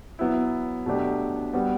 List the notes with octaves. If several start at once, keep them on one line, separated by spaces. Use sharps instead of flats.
F#3 B3 E4
B2 F#3 A3 D4 G4
G3 B3 F#4